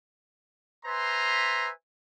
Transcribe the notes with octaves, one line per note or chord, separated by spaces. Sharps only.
B4 C5 E5 G#5 A#5 C6